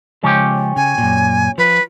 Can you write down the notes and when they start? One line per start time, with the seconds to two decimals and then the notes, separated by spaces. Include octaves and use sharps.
0.23 C#3 F3 G#3 C#4 G4
0.76 C#3 G#5
0.98 F#2 A#2
1.58 F3 B4